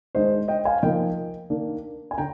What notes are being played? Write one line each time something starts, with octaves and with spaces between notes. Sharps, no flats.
D#3 G#3 D4 C5 D#5
D#5 G5
F5 G#5
F3 A#3 D#4 D#5 G5
D#3 A#3 D4
G#5
D3 G5 A#5